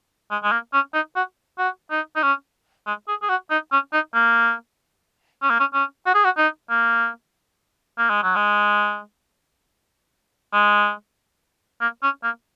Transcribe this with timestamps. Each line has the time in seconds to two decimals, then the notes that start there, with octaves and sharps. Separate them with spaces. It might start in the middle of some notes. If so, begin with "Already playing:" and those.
0.31 G#3
0.43 G#3
0.52 A#3
0.73 C#4
0.94 D#4
1.16 F#4
1.58 F#4
1.91 D#4
2.16 D#4
2.23 C#4
2.87 G#3
3.08 G#4
3.22 G#4
3.29 F#4
3.51 D#4
3.72 C#4
3.93 D#4
4.14 A#3
5.42 C#4
5.50 A#3
5.60 C#4
5.74 C#4
6.06 F#4
6.15 G#4
6.24 F#4
6.38 D#4
6.70 A#3
7.98 A#3
8.10 G#3
8.23 F#3
8.36 G#3
10.53 G#3
11.81 A#3
12.03 C#4
12.23 A#3